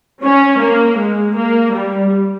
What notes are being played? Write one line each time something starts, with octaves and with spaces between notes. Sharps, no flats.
C#4
A#3
G#3
A#3
G3